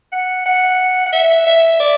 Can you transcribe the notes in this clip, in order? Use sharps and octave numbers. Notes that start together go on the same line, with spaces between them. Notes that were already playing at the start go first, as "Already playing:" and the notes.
F#5
F#5
F#5
E5
E5
D5